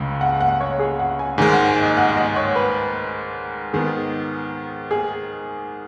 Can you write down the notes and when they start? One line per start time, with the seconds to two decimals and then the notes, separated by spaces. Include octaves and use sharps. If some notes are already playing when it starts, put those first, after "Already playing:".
Already playing: C#2 C#3 G#3
0.21 F#5
0.40 F#5
0.60 C#5
0.79 G#4
0.99 F#5
1.19 G#5
1.38 G#2 D#3 G#3 G#5
1.53 F#5
1.68 G#5
1.83 D#5
1.97 F#5
2.09 F#5
2.17 D#5
2.36 C#5
2.56 B4
3.73 G#2 D#3 B3 G#4
4.91 G#4